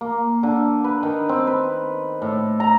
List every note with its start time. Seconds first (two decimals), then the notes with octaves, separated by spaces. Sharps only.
0.01 A#3
0.43 D3
0.84 B4
1.03 D#3
1.29 C4
1.47 B4
2.22 A2
2.60 A#5